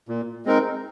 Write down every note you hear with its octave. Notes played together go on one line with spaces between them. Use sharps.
A#2
G#3 C4 D#4 A#4